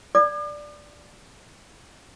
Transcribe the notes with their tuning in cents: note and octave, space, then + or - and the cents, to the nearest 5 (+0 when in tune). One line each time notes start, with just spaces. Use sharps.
D5 +0 D6 +45